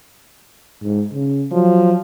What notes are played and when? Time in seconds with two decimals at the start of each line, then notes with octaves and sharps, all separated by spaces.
0.83 G#2
1.13 C#3
1.52 F3 F#3